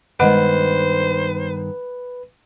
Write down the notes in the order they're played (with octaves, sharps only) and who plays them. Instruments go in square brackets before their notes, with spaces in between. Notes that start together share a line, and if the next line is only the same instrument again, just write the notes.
[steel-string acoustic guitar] G2 D#3 B3 [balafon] G#3 D#5 F#5 [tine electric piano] B4 [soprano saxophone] C5